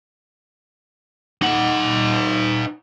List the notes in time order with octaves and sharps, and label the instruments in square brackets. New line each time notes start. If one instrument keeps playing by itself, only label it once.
[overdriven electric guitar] D#4 F#5